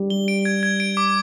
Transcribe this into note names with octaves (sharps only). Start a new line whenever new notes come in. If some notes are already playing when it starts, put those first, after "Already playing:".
Already playing: G3
G7
D7
G#6
G#6
D7
D6